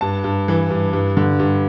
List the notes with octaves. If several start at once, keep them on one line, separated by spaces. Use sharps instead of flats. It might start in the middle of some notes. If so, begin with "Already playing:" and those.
G2 A5
G2
E3
G2
G2
D3
G2